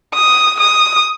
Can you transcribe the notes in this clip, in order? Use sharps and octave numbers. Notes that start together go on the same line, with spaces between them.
D#6
D#6